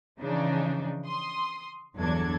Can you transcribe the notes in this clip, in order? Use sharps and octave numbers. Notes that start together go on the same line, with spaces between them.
C#3 E3 F3 D4 D#4
C6 D#6
G1 E2 F#3 D4 A4 G#6